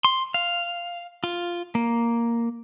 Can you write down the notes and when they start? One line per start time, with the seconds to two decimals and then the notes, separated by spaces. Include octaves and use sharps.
0.04 C6
0.34 F5
1.24 F4
1.75 A#3